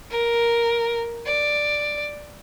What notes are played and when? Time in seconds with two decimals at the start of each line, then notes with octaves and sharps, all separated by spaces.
0.11 A#4
1.26 D5